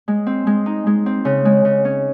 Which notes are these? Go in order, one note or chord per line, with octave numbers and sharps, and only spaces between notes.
G#3
C4
G#3
D#4
G#3
C4
C#3
G#3
C#3
C#4